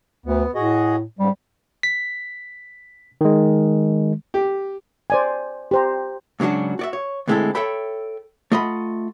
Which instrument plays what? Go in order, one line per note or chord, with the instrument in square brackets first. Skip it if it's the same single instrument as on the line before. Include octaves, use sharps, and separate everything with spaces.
[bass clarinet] D2 [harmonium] B3
[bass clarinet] A2 [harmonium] F#4 G#4 D#5
[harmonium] G#2 C#3 [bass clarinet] G3
[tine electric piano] B6
D#3 G#3
[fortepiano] G4
[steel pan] C5 D5 G#5
G4 C5 A#5
[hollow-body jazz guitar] G#2 C#3 F#3 D4 F#4
F#4 D5 E5
C#5
D2 A2 G#3 C4 E4 A4
A4 C#5 E5 G5 B5
A3 F4 D#5 F#5 B5